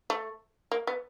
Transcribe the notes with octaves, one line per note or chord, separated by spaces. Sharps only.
A3
A#3
B3